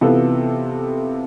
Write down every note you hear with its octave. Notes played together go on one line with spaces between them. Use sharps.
C3 E3 B3 F4 A4